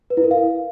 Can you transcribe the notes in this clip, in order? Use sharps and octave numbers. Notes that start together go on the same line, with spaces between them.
B4
E4
A#4
F5